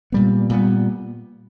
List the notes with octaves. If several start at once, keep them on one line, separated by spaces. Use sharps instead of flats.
A#2 G3 B3
A#2 G3 B3